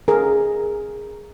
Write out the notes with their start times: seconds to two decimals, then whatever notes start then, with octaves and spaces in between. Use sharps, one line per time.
0.08 G#4 A#4